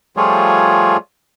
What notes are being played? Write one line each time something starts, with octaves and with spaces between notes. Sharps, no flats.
F3 G3 A3 F4 G#4 C#5